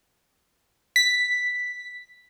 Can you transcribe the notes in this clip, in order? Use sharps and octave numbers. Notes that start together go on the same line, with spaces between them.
B6